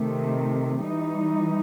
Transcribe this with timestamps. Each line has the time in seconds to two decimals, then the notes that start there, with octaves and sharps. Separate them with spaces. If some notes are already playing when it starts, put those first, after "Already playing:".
Already playing: C3 D#3 A3
0.83 E3 G3 D#4